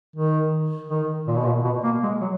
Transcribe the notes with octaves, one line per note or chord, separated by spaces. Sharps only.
D#3
D#3
A#2
B2
A#2
B2
A#3
G#3
F#3